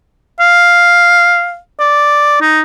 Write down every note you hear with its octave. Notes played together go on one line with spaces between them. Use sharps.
F5
D5
D#4